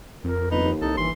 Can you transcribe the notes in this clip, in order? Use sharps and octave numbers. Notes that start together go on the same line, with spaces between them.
F2 A#4
G1 D#4 B4
D#2
C2 D#4 A4
G1 E3 C6